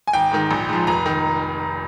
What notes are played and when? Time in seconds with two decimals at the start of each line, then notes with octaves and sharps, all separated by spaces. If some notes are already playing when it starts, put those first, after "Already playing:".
0.07 G#5
0.13 G#1 G5
0.32 G#2 D#3
0.51 A#1
0.69 G#2 F3
0.87 F1 A#5
1.06 D#3